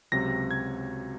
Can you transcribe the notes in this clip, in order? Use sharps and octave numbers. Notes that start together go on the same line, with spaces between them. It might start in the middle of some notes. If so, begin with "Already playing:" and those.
C#2 C3 F#3 A#6
G#6